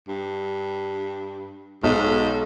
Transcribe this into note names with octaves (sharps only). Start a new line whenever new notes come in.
G2
B1 G#2